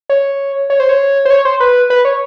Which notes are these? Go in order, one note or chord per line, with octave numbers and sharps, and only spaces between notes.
C#5
C#5
C5
C#5
C5
C#5
C5
B4
B4
C#5